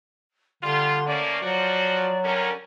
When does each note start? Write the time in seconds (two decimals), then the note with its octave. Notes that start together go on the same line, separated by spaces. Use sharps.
0.63 D3 G3 F4 C6
1.07 A3 A#3 C#4 D5
1.43 F3 F#3 F#4
2.24 D3 G3 C#4 A#4